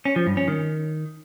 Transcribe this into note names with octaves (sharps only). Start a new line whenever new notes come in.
C#4
F3
G2
C#4
D#3